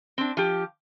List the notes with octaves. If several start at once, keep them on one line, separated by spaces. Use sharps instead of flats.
C4 D4
F3 G4